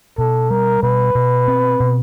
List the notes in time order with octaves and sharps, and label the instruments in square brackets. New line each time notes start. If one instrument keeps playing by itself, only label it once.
[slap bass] B2 [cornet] A4
[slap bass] G3 [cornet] A#4
[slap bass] B2 [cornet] B4
[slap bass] B2
C4
B2